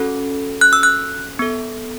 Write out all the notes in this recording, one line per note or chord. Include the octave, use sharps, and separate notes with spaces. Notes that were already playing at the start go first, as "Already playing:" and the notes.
Already playing: C#4 F#4 A4
F#6
E6
F#6
B3 A4